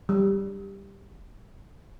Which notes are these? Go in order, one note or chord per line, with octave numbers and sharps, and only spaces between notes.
G3